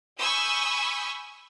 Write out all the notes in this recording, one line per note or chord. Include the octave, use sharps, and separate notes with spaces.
G#5 B5 C#6 D#6 E6 G6